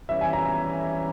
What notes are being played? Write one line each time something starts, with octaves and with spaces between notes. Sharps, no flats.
E3 G3 C#4 E5
G#5
A#5
A#5